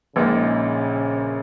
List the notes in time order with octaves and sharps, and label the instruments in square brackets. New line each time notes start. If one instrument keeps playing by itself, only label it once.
[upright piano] A#1 A#2 G#3 D#4 [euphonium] C#3